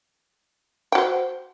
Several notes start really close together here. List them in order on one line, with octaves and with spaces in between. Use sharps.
G5 F#4 C5